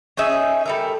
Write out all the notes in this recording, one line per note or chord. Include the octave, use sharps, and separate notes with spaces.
C#4 D#4 G#4 E5
G3 A4 A#4